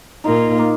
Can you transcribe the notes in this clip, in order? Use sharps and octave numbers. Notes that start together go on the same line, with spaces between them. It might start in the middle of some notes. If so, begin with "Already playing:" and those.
A#2 A#3 D#4 F4 A#4
A#3